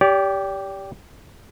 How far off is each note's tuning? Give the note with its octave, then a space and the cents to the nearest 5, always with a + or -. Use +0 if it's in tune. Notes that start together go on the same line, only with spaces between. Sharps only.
G4 +0 D5 -40